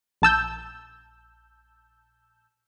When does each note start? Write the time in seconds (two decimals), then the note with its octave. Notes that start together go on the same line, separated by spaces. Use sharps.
0.22 A#1 A5 E6 G6